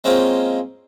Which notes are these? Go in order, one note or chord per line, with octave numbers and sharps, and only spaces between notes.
G#3 A#3 C4 C#4 F4